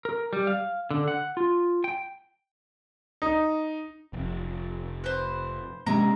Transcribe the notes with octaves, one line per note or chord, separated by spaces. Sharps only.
A#4
G3
F5
D3
F#5
F4
G5
D#4
F1
B4 C5
C3 G#3 A#3 C#4 D4 A#5